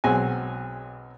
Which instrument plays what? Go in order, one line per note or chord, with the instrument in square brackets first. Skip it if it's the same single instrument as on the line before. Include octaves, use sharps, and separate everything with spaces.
[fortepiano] B1 F#3 G#3 C4 G#5